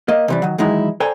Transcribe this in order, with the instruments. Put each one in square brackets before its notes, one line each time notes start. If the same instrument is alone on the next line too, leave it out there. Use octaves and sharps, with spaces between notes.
[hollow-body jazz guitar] A#3 D#5
C3 E3 G3
D#3 F#3
D#3 E3 F#3 G#3 D#4 E4
A4 C5 D5 G5 G#5 A#5